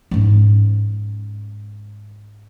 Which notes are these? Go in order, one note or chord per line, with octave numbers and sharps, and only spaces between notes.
G#2 C#4